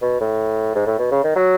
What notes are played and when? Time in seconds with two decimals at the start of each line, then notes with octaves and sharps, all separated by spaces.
0.02 B2
0.20 A2
0.75 G#2
0.87 A2
0.99 B2
1.11 C#3
1.24 D#3
1.35 F#3